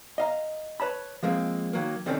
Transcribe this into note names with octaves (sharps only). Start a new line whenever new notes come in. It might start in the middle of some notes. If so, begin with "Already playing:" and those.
D#5 F5 A#5
B4 C#5 A5 B5
F3 G#3 A#3 C4
D#3 F#3 A#3
C2 D3 D#3 C4 C#4 D#4